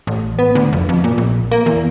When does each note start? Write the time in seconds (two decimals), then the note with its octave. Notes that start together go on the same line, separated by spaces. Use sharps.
0.07 A1
0.39 B3
0.55 D2
0.73 F1
0.89 F2
1.04 A#2
1.18 A#1
1.52 A#3
1.66 E2